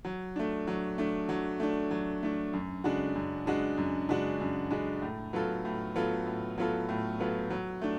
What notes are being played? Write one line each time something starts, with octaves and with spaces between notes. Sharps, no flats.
F#3
A3 D4
F#3
A3 D4
F#3
A3 D4
F#3
A3 D4
F#2
C#3 G#3 D4 F#4
F#2
C#3 G#3 D4 F#4
F#2
C#3 G#3 D4 F#4
F#2
C#3 G#3 D4 F#4
A2
F#3 B3 F4 A4
A2
F#3 B3 F4 A4
A2
F#3 B3 F4 A4
A2
F#3 B3 F4 A4
F#3
A3 D4